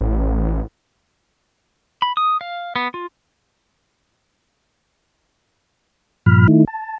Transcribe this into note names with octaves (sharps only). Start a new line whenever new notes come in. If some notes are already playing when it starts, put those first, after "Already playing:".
A1
B5
D#6
F5
B3
F4
G2 A#2 F3 B5 F6
D#3 A3 D#4 E4
A5